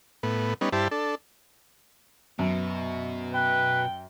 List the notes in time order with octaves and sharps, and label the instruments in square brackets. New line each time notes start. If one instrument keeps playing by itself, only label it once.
[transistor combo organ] A2 B3
G3 B3 C#4 D#4
G2 E4 G4 C5 A5
D4 A4
[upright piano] F#2 [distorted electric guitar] B2
[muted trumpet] B4 [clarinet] G5